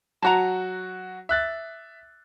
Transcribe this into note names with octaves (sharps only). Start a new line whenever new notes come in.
F#3 F#4 A5 A#5
E5 F#6 A6